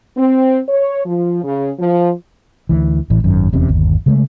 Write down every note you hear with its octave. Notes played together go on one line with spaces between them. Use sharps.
C4
C#5
F3
C#3
F3
D2 E3
A1 A2 E3
G#1 F#2 D#3
F1 E2 C3 C#4
G1 D#2
C#3 G#3 A3